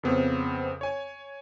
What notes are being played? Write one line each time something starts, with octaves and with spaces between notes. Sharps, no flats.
F2 C#3 B3 C4
C#5 G#5